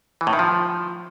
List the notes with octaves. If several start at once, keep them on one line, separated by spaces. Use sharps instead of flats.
E3
A2
D#3
F3